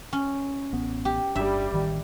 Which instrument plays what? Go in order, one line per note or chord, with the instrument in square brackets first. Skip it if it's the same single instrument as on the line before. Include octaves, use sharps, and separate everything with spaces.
[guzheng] C#4
[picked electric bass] A1 B3
[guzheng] G4
[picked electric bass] G1 D4 [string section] G3 [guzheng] E5
[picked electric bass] A1 D#3